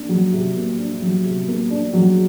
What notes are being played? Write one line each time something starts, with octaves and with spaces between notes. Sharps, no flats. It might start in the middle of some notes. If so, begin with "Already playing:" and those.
Already playing: A#3 D4
F#3
C3
A#3
D4
F#3
C3
A#3
D4
F#3